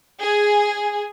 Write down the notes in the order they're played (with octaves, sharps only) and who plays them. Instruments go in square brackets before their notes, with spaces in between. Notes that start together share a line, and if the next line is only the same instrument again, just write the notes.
[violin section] G#4